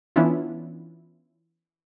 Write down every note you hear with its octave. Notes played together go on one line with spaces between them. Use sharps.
E3 B3 C#4 D4 E4 F4